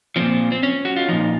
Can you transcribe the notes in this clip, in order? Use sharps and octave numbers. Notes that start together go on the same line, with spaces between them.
A#2 F3 C4
C4
C#4
F#4
F4
A#2 F3 D#4